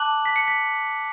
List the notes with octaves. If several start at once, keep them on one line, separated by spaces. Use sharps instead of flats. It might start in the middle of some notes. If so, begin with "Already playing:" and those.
Already playing: A5 D6 F#6 F#7
B6
C#7
B6